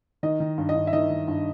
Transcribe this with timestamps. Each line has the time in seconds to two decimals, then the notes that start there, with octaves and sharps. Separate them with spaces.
0.23 D#3 D#5
0.40 D#3
0.58 G2
0.69 D#5
0.75 G2
0.87 E5
0.93 D#3 D#5
1.10 D#3
1.28 G2